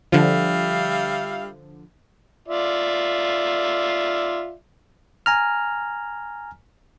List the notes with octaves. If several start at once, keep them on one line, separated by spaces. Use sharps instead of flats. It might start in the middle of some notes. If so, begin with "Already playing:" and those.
D3 F3 G3 E5 F5
F4 D5 E5
G#5 A#5 F6